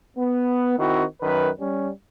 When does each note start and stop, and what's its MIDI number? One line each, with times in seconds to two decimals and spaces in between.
0.17 0.76 59
0.77 1.04 51
0.77 1.04 60
0.77 1.04 64
0.77 1.04 66
1.21 1.49 42
1.21 1.49 51
1.21 1.49 71
1.59 1.90 55
1.59 1.90 61